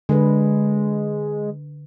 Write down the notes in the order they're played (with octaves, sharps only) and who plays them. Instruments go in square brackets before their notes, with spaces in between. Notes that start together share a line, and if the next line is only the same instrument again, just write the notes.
[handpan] D3 B4 [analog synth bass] G#3